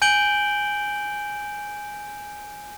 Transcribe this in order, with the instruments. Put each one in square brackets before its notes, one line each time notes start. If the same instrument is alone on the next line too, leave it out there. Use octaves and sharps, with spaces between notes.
[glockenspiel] G#5 G6 D7 F#7 G7